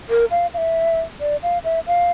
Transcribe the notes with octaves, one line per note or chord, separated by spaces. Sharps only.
A#4
F5
F5
E5
D5
F5
E5
F5